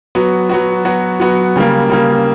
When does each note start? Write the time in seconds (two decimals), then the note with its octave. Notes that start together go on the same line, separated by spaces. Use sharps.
0.15 F#3 B3 F#4
0.49 F#3 B3 F#4
0.85 F#3 B3 F#4
1.20 F#3 B3 F#4
1.56 C#3 G3 A#3
1.90 C#3 G3 A#3